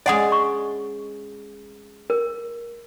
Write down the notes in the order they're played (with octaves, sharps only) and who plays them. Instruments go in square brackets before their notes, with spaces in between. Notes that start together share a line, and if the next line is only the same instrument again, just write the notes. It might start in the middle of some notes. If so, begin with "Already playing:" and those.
[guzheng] G#3 C#4 D5 [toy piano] D#5 F#5 D#6
[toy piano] C#6
A#4